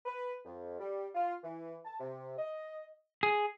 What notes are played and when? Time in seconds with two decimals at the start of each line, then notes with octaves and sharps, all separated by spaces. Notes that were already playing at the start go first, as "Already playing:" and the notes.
0.06 B4
0.45 F2
0.79 G3
1.15 F4
1.43 E3
1.85 A5
2.00 C3
2.38 D#5
3.23 G#4